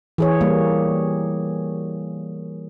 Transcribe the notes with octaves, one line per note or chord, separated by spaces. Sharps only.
E3 G#4 C#5
G3 A#3